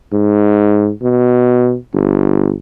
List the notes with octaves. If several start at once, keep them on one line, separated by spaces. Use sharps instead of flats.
G#2
B2
G1